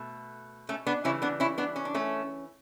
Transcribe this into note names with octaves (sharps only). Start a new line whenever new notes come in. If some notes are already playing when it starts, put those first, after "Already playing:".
Already playing: B2 A3
A3 C#4
B3 D4
C#3 E3 G3 C#4 E4
B3 D4
C#4 E4
B3 D4
C#4
D4
A3 C#4